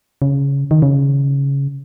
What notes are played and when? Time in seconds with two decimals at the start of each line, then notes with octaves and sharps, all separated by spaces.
0.22 C#3
0.71 D#3
0.82 C#3